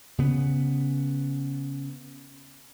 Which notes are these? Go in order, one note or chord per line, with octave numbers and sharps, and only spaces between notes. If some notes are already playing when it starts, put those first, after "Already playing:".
C#3 B3